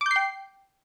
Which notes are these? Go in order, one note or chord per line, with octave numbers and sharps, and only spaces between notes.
G5 D6 G6 C7